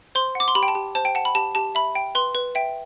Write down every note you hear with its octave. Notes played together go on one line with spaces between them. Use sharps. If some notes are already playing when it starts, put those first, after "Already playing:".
C5 C6
F#5 D6
C6
G4 B5
G5
A5
G4
C5 A5
G5
F#5 A5
B5
G4 A5
G4 A5
E5 B5
G5
B4 C6
B4
E5 G5